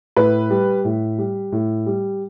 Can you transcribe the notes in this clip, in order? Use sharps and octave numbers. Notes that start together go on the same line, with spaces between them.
A2 B4
G3
A2
G3
A2
G3